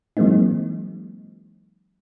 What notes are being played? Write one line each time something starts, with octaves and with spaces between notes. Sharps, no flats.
E3 F#3 G#3 A#3 C4 D#4